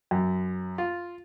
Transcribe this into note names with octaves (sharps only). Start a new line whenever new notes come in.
F#2
F4